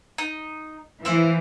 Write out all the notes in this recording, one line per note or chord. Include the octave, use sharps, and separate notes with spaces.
D#4
E3 E4 C5 F5